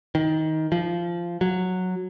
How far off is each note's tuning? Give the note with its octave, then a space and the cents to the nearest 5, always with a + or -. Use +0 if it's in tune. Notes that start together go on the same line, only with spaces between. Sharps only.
D#3 +20
F3 -15
F#3 -10